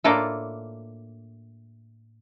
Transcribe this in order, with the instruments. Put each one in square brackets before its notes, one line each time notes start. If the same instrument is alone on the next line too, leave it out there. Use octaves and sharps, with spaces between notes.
[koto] A2 A#3 D4 F4 A4